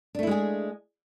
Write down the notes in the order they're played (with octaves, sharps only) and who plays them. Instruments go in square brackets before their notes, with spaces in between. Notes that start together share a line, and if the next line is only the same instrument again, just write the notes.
[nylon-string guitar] D4
A3
E4
G#3
G#4